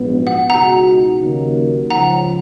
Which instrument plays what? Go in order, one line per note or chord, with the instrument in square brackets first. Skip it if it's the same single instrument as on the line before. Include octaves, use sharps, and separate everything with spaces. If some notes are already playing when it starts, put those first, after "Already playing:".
Already playing: [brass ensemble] A#1 G#2 F#3 B3
[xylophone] F#5
[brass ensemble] C#2 B2 G#3 D#4 F#4 [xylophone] F#5 A#5
[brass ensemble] D#2 C#3 F#3 A#3 D#4
[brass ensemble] C#2 C#3 F3 [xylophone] F#5 A#5